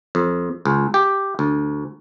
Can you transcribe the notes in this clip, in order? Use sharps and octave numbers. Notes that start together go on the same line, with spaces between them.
F2
C#2
G4
D2